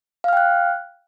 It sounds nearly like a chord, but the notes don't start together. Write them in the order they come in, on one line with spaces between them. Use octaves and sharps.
F5 F6 G5 F#6